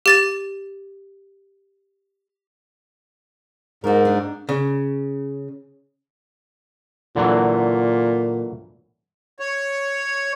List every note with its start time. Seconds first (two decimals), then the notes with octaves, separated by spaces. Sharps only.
0.06 G4 A6 E7
3.84 G#2 F#4 A#4
4.05 D4
4.49 C#3
7.16 A#2 D3 E3 F#3
9.40 C#5